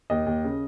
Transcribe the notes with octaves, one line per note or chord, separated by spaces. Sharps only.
D#2 D#5
D#2
C#3